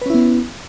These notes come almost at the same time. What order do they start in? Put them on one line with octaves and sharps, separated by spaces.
B4 C#4 E4 B3